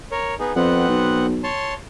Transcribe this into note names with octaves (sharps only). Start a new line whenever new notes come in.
A#4 C#5
B3 D#4 G#4
F2 B3 C4 F#5
B1
C#5 A5 C6